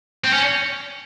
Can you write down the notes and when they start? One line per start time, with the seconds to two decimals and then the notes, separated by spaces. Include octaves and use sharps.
0.24 C4
0.33 C#4